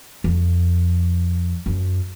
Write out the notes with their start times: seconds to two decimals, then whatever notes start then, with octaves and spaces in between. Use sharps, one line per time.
0.24 F2
1.66 F#2